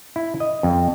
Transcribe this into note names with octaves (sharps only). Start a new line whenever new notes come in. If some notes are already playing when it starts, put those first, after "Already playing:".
E4
D#5
F2